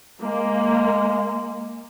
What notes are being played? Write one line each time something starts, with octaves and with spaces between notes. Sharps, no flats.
G#3 A#3